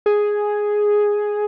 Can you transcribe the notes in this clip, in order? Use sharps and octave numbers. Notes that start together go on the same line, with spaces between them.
G#4